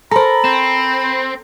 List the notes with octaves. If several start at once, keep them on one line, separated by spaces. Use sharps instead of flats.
A4 A#4 C5 A#5 B5
C4 E7